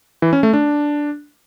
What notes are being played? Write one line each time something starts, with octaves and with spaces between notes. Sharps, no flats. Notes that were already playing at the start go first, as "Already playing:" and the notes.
E3
C#4
A3
D4